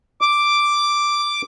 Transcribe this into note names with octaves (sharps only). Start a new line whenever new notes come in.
D6